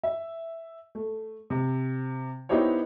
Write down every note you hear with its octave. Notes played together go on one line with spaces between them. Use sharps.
E5
A3
C3
B3 D#4 E4 G4 C5 C#5